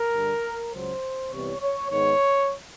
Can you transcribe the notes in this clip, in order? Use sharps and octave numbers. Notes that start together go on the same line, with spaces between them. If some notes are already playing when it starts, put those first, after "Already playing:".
Already playing: A#4
G2 D3 G3
C#2 C#3 F#3 C5
C2 C3 E3 G3 B3 C#5
C#5
G#2 D#3 G#3 B3 C#5